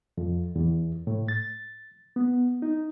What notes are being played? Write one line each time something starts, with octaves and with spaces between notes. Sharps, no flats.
F2
E2
A2
A6
B3
D#4